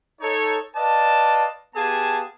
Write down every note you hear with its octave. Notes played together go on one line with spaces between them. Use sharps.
D#4 A4 C#5
B4 D5 D#5 F5 A5
B3 G4 G#4 F5 G#5 A5